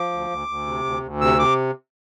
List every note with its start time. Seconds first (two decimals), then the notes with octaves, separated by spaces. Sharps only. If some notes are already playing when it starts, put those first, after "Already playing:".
Already playing: F3 D6
0.11 D2
0.30 D2
0.48 D2
0.66 C3
0.84 D2
1.03 D2
1.21 C3 E6
1.39 C3 D6